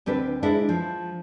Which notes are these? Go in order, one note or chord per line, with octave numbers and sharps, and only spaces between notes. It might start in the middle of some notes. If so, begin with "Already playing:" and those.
D2 C4 D4 B4
G#3 D4 E4
F3